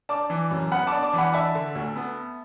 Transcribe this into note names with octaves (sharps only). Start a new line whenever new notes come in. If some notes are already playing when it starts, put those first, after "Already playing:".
D4 A5 D6
E3
F#2
B3 F#5 B5
A5 D6
D4
A5 D6
E3 F#5 B5
D4 E5 A5
D3
D2
B3